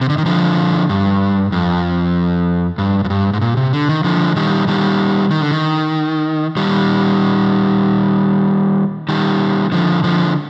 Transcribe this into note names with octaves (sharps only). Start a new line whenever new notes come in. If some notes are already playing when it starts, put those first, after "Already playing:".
C3
D3
D#3
D3 F3
G2
F2
G2
F2
G2
G#2
A#2
C3
D3
D#3
D3 F3
D#3 G3
D#3 G3
D#3
D3
D#3
D#3 G3
D#3 G3
D3 F3
D3 F3